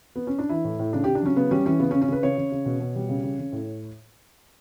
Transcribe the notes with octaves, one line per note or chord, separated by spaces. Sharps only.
B3
C#4
D4
E3 E4
A2
A2
C#3 D4
C#3 G4
D4
F#3 C#4
C#3 B3
G3 C#4
E3 C#4
C#3 B3
C#4
C#3
C#4
C#3 B4
C#3 C#5
C#3
C#3
B2
B2
G3
C#3
C#3
C#3
A2